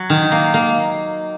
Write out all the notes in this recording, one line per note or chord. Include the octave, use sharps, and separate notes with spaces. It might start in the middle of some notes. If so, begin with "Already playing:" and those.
Already playing: F#3
D#3
A#3
A#3